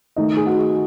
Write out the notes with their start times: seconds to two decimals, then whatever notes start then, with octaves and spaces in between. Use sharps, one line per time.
0.16 D#3 A3 D#4 D#5
0.37 G#4
0.47 F#4